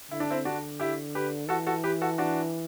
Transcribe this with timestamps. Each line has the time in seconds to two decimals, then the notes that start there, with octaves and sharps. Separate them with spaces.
0.11 D3 E4
0.20 D4
0.30 C4 E4
0.45 D4 F#4
0.80 E4 G4
1.15 G4 B4
1.49 E3 F#4 A4
1.67 F#4 A4
1.84 G4 B4
2.02 F#4 A4
2.18 D4 F#4